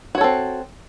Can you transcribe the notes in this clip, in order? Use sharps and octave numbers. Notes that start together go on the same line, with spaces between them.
C4 F#4 A4 C#5